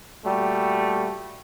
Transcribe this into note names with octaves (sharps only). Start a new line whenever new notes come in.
A#2 G3 A3 F#4